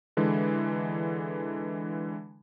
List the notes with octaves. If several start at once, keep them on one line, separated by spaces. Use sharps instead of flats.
D3 E3 G#3